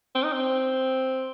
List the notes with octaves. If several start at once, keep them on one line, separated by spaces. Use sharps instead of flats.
C4
D#4
C4